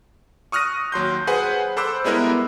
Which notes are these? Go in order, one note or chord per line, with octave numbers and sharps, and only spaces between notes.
C#6 D#6 F6 F#6 A#6 D#7
D#2 F#3 C6 G6
G#4 B4 C5 F#5 G#5
A4 C5 B5 D6 E6 F#6
G3 G#3 B3 E4 A#4